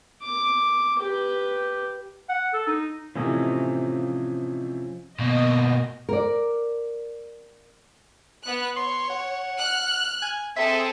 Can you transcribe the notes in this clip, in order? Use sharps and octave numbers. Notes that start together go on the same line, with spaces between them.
D6
G4 B4
F#5
A4
D#4
A2 C3 E3 F3 C#4 D#5
B2 A#3 D#5
A#4 D5
B3 F#6
C#5 C6
F#5
F6 F#6
G#5
C4 G#4 A4 E5